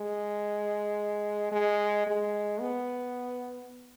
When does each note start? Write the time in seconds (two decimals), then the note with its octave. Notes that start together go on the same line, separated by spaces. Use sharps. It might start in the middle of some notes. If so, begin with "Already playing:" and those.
Already playing: G#3
1.52 G#3
2.07 G#3
2.61 B3